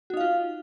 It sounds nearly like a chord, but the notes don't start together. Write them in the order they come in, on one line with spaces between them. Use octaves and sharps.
F#4 D#4 F5 F4